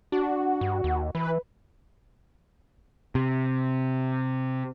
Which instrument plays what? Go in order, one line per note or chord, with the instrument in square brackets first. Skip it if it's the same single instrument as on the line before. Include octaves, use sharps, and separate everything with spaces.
[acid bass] D4 [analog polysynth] F#4
[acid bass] G2
D#2
[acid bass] E3 [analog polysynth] B4
[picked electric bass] C3